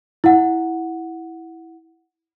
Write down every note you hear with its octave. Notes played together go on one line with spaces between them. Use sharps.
E4 F#5